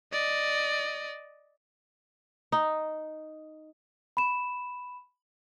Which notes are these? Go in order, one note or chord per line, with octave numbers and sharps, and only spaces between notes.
D5 D#5
D#4
B5 E7